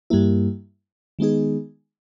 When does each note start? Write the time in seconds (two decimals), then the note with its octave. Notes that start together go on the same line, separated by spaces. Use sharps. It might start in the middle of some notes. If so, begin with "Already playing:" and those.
0.10 G2 G3 A#3 E4
1.19 D#3 G#3 B3 D#4 G#4